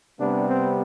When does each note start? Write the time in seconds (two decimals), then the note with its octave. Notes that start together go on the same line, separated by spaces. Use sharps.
0.18 C3 G3 B3 D4
0.47 C4